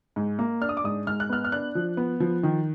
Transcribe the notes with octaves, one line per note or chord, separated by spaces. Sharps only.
G#2
A#3
D4 F6
D#6
D6
G#2 D#6
G#2 F6
F#6
B3 F6
F6
D4 F#6
F3
B3
F3
D#3